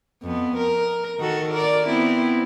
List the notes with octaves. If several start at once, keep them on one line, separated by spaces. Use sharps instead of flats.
F2 B3
A#4
D#3 F#4 A4
A#4 D5
B3 C4 E4